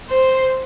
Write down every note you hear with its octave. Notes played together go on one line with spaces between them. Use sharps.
C5